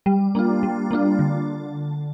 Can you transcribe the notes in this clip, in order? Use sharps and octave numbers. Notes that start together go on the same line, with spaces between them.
G3
A#3 D4 F4
G3
A#3 D4 F4
D3